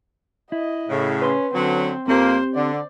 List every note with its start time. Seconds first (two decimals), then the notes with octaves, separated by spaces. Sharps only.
0.52 E4 D#5
0.89 A2 C#3
1.22 C#4 B4 C6
1.54 D3 F#3 C4
2.08 F2 A#3 C4 G4 C5
2.55 D3 D5